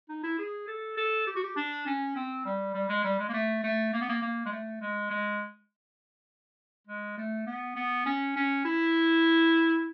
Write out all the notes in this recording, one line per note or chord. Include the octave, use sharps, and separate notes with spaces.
D#4
E4
G#4
A4
A4
G4
F#4
G4
D4
C#4
C4
G3
G3
G#3
G3
G#3
A#3
A3
A3
A#3
B3
A#3
A#3
G#3
A3
G#3
G#3
G#3
A3
B3
B3
C#4
C#4
E4